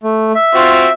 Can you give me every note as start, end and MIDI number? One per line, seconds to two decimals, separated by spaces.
0.03 0.32 57
0.35 0.92 76
0.55 0.87 60
0.55 0.87 65
0.55 0.87 66